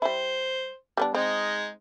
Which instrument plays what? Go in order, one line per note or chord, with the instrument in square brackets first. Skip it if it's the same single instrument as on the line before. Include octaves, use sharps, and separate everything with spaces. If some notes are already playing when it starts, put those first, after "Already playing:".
[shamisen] G3 E4 [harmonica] C5
[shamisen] G3 B3 D4
[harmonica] G#3 D#4 [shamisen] C4